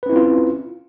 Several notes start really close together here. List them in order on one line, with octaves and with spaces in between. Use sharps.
B4 C#4 E4 C4 F4